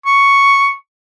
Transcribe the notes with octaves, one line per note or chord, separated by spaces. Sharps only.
C#6